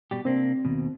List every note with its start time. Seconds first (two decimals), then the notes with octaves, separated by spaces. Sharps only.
0.11 B2 G3 G4
0.25 C3 A#3 C4 D4
0.65 D#2 B2